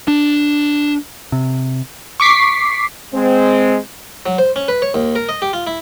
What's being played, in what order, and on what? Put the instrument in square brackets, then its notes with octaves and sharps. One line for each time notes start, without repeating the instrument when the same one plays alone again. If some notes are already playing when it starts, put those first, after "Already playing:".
[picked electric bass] D4
C3
[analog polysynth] C#6 D6 B6 C7
[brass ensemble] G#3 C4
[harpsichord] F#3
C5
C#4
B4
C#5
D#2
A#4
D#5
G4
F4
E4